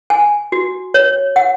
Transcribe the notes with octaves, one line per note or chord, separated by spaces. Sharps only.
G#5
F#4
C#5
F#5